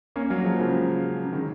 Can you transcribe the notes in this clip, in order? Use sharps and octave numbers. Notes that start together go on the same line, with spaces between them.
A#3 C#4
F#3 A#3
F3 G#3
C#3 F3
C#3
D#3